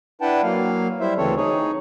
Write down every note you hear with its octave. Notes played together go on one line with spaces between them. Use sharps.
D4 E4 B4 F#5 G5 A5
F#3 A#3 F5
G3 E4 C5 E5
D2 C#3 E3 C4 A4 C#5
D#4 G#4 C#5